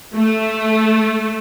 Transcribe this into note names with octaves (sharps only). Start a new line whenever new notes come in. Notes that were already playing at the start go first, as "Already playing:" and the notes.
A3